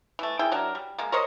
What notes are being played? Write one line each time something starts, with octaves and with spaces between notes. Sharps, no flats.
E3 A3
D#3 E4 G#4 G5
F#3 D4 A#4
G3
G#3 A#3
A#4 C5 C#5 D#5